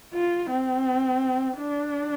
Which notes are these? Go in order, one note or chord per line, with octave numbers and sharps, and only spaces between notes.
F4
C4
D4